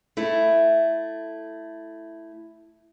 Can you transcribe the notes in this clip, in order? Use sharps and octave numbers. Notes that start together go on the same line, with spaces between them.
A3 E4